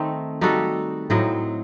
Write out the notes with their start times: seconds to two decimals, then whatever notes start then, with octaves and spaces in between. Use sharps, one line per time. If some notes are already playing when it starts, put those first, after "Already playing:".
Already playing: D#3 A3 C4 D#4
0.41 G3 D#4 F#4 A4
1.10 A2 F#3 C4 D#4